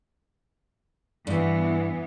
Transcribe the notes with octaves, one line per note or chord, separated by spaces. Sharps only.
G2 E3 B3